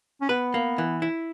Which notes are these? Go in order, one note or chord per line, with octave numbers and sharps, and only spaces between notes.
C#4
B3 B4
A#3
E3
E4